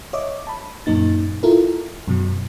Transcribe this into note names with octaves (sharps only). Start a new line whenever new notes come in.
C#5 D#5 E5 D6
A5 B5
F#2 A#2 A#3 D#4 A6
E4 F4 A4 A#4
F#2 B2 F#3